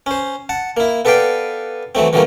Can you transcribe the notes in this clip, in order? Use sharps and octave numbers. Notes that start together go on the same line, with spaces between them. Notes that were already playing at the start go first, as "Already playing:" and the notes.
C#4 C5
F#5 A5
A#3 E4
B3 A4 B4 D5 F5 G5
E3 F#3 A3 C4
D3 E3 F#3 G3 A3 A#3